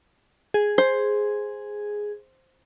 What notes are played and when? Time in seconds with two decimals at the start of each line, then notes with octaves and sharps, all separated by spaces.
0.54 G#4
0.78 C5